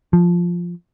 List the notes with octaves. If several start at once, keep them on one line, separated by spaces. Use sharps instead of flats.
F3